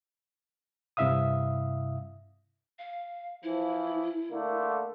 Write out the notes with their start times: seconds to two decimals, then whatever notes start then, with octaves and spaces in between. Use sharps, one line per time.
0.97 G2 C3 E4 E5 F5 D#6
2.79 F5
3.43 E3 F3 E4
4.31 D3 A3 A#3